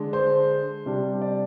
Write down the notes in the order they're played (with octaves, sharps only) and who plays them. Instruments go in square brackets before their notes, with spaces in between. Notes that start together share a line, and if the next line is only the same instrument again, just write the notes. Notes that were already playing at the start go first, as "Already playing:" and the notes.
Already playing: [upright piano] D3 G#3 D4
C5
C3 G3 D4
D5